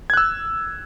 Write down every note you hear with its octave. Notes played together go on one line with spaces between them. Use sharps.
E6 F#6 G#6